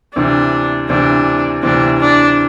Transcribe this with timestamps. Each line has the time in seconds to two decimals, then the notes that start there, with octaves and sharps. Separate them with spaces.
0.16 D2 C3 E3 C4 D4
0.89 D2 C3 E3 C4 D4
1.63 D2 C3 E3 C4 D4
2.00 D4